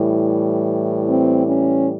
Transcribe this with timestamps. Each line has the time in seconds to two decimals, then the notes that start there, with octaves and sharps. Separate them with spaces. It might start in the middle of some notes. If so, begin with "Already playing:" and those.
Already playing: A2 E3 G3
1.08 C4
1.46 C#4